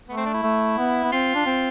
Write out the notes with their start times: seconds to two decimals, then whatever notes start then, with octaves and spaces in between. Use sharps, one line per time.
0.08 A3 B3
0.17 C4
0.26 D4
0.34 E4
0.43 A3
0.77 B3
1.04 B3
1.12 C4 F4
1.35 D4
1.46 C4